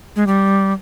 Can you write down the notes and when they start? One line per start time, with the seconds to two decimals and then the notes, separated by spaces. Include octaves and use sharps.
0.16 G#3
0.27 G3